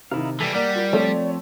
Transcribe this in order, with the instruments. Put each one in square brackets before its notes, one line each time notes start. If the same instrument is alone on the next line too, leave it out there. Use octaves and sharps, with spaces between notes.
[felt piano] C3 D#3 [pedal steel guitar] D#4 E4 F5
[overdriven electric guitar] E3 G3 [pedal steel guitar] A4 [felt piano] B6
[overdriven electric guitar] G3 [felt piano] A#3 [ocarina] D5 [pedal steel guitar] F#5
[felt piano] F4 A#4
[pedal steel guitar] F3 C4 A5 [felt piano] A3 A4 C#5